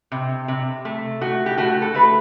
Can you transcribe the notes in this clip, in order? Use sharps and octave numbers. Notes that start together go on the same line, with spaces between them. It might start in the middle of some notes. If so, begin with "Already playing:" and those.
C3
C3
A3
A3 F#4
G4
A3 F#4
A4
A3 B4